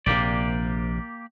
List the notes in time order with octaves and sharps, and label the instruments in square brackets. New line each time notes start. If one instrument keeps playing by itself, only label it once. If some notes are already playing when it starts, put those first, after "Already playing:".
[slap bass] A#1 C3 [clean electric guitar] A#3 G4 D5